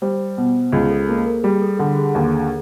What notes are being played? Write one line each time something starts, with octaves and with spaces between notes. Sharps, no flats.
G3 C5
B2
C#2 G#4
A4
A#3 A4
A#4
G3 G#4
A4
D3 A4
G#4
D#2